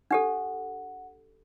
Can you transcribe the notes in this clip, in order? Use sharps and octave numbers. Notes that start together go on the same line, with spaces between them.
D4 G4 A4 F#5